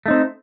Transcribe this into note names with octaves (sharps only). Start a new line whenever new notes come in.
A3 C4 D#4